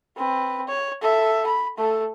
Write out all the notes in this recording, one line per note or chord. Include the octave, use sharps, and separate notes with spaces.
C4 B4
C#5
A4 E5
B5
A3 A4